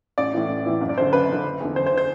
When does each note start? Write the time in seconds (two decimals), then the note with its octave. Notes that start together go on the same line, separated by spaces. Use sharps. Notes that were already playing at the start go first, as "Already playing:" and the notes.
0.18 A1 D5
0.34 A2 E3
0.49 A1
0.66 A2 E3
0.81 F#1
0.89 D5
0.97 F#2 C5
1.00 D3
1.13 F#1 B4
1.29 F#2 D3
1.44 F#1
1.60 E2 D3
1.76 F#1 C5
1.87 C5
1.92 D3
1.98 C5